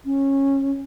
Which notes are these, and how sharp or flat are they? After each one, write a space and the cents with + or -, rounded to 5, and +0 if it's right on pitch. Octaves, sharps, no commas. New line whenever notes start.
C#4 -20